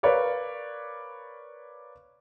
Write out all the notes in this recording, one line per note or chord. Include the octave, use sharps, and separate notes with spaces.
A#4 B4 C#5 D5 F5